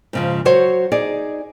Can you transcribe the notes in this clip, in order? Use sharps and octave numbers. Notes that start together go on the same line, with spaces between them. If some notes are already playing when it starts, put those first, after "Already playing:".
G#2 C#3 F3
F#3 F#4 C5 C#5
D#4 G#4 D5